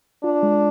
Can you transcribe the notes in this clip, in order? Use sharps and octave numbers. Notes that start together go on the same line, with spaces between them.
D4 F4
G#3